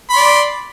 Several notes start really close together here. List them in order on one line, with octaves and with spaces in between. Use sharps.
B5 C6 D5